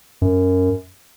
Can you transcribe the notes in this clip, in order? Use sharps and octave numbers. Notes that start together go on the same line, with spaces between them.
F#2